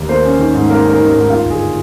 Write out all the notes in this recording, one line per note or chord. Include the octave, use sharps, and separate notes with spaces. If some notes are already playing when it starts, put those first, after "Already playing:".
Already playing: D#2
A#3 C5
C#4
D#3
G#2
A#3 A#4
C#4
A#4
D#3
A#4
G#2
D#3 F4
G1
G#4